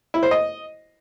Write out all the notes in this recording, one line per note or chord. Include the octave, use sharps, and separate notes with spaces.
E4
C5
D#5